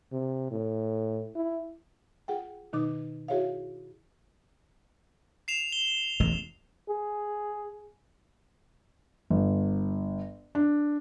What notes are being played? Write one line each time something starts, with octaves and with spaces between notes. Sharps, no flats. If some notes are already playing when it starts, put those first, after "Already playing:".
C3
A2
E4
F4 G#4 F#5 G5
B2 D#3 D#4 D6
E4 F#4 G#4 C#5 E5 F5
C7 E7 F7
G7
E1 A1 G#3
G#4
G1
D4